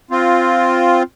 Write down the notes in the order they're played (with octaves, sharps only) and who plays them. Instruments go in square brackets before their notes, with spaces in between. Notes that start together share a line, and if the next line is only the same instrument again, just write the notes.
[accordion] C4 F4